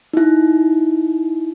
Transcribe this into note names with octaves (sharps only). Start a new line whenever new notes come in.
D#4 E4